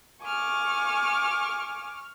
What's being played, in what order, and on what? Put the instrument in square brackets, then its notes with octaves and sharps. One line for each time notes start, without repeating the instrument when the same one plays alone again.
[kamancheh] G#5 D6 [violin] C#6 F6